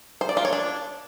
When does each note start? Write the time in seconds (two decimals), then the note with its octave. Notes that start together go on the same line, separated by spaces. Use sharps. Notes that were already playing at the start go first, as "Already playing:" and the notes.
0.21 C5
0.29 D5
0.37 F4
0.45 C#5
0.53 D4